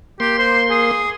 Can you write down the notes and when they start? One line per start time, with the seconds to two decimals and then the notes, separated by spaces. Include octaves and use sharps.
0.20 A#3 G4 C6
0.39 C5
0.70 G#4